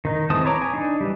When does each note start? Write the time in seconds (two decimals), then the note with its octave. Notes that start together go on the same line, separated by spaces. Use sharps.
0.05 D#3 D#4
0.30 E3 G#3 C4 A5 D#6
0.45 B4 C#5 A#5 D6
0.62 G#5
0.74 D4 D#4
1.01 E3 G3